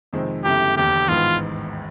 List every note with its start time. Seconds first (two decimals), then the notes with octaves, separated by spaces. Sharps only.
0.13 F2 C3 D#3 G#3 C4
0.45 G1 F#2 C#3 E3 A3 G4
0.76 E1 D#2 D3 G4
1.08 A1 G#2 D#3 G#3 B3 F4